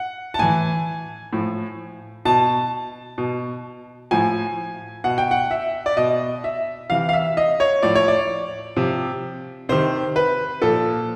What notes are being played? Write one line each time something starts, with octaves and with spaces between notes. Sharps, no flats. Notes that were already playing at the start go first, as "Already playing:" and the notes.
Already playing: F#5
A5
A2 E3 G#5
A2 F3
B2 A5
B2
A2 F3 G#5
B2 F#5
G5
F#5
E5
D5
B2 D#5
E5
C3 E3 F5
F5
E5
D#5
C#5
A2 F3 D5
C#5
D5
C3 F3
C3 D#3 C5
B4
A#2 F3 A4